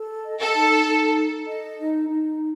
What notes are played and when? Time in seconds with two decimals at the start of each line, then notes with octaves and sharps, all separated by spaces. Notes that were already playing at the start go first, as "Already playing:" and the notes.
Already playing: A4
0.25 D#5
0.41 A4
0.55 D#4
0.87 D#4
1.17 A4
1.47 D#5
1.79 D#4
2.09 D#4